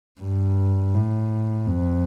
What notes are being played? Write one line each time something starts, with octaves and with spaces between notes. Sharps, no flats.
G2
A2
F2